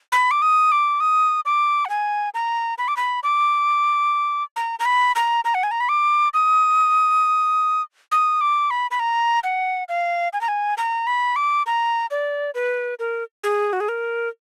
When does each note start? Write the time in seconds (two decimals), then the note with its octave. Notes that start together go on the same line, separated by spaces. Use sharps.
0.12 B5
0.31 D6
0.42 D#6
0.72 D6
1.00 D#6
1.46 D6
1.85 F#5
1.89 G#5
2.34 A#5
2.78 B5
2.88 D6
2.97 B5
3.23 D6
4.56 A#5
4.80 A#5
4.85 B5
5.16 A#5
5.45 A#5
5.55 F#5
5.63 G#5
5.71 A#5
5.80 B5
5.89 D6
6.34 D#6
8.12 D#6
8.41 D6
8.71 B5
8.91 B5
9.00 A#5
9.44 F#5
9.89 F5
10.33 G#5
10.41 A#5
10.48 G#5
10.78 A#5
11.07 B5
11.36 D6
11.66 A#5
12.11 D5
12.55 B4
12.99 A#4
13.44 G#4
13.73 F#4
13.80 G#4
13.89 A#4